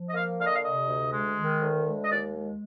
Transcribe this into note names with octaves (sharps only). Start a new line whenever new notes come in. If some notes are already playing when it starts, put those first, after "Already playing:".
Already playing: F3
D#5
A#3 F5
D3 F5
D#5
F5
C3 D#5
D2
G#3
D#3
D2
G#3
D#5
D#2 D5
G#3